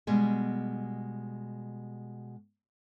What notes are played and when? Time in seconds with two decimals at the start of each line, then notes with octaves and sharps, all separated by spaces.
0.07 B2 G3 G#3 G#4